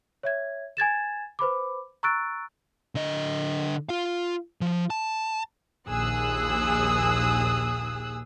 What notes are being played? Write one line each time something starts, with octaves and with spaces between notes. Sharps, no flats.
C#5 E5 G#6
G#5 G#6 A6 E7
B4 C5 B5 D6
A#5 C#6 E6 F#6 A6 D7
D3 D#5
F4 F5
F3
A5
A#1 D#2 G#4 D#6 E6 F#6